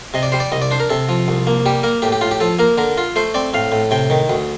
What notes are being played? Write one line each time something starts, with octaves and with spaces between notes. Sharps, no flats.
C3 D#5
D5
G3 C5
D5
C2 D#5
D5
D4 C5
A#4
C3 A4
F3
C2
A#3
G3 G4
A#3 A#4
A2 G4
G4
A2 F4
G4
F3 A4
A#3 A#4
D3 A#4
F4
A3 C5
C4 D5
A2 F5
A2
C3 G5
D#3
D2